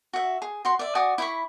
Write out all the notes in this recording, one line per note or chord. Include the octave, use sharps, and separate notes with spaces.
F#4 E5
G#4
F#4 C6
D5 E5
F#4 D5 G#5 D#6
E4 B5 C#6